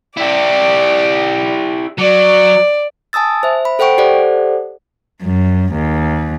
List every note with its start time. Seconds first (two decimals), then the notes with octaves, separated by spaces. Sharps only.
0.17 E4 G4 D5
1.98 F#3 D5
3.13 G#5 A5 D#6 E6 A6
3.43 C5 E5
3.65 B5
3.79 A4 C5 F#5 G5 C#6 D7
3.98 G4 A4 C5 D5 F#5
5.22 F#2
5.74 D#2